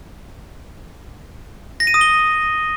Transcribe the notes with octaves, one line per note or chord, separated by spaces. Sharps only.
A#6
D#7
D#6
G7